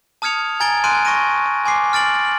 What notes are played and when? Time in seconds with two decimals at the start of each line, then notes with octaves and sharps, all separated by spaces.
0.22 A5 D#6 F6 G#6 C#7 F7
0.60 G#5 A#5 G#6 A6 D7 G7
0.84 G#5 C6 F6 F#6 D7 D#7
1.05 C#6 A#6 D#7
1.65 G#5 C6 D6 C7
1.93 F6 A6 D7 F#7